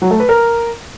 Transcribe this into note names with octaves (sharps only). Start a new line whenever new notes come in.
F#3
A3
B4
A#4